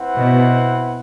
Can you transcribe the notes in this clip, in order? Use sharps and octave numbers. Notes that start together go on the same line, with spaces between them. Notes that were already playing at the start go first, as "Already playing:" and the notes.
Already playing: C4 E4 B4 F#5
B2